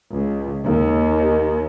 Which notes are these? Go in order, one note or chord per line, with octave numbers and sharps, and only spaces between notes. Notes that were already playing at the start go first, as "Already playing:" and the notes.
C#2
D#2